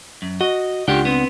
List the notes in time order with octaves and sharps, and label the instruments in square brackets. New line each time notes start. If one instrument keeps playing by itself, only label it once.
[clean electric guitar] F#2
[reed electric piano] F#4 [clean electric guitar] D#5
[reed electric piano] C#2 D4 F#5 [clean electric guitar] F4 G4 G5
[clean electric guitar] B3 C4